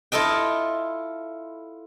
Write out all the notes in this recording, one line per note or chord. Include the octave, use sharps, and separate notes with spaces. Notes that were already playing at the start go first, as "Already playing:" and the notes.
E4 F4 A4 D#5 G5